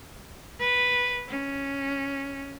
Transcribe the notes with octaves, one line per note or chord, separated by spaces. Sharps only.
B4
C#4